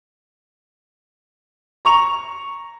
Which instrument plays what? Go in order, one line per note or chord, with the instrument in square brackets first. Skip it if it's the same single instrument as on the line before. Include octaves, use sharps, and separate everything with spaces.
[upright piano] A#5 C#6 F7